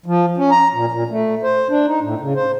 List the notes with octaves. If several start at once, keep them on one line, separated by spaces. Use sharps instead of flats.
F3
C#4
A#5
A#2
A#2
A3
C5
D4
D#4
A2
C#3
C5